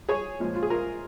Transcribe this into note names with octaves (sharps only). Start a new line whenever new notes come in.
G#4 C#5
A#2 F3 G#3
F4
G#4
F4 A#4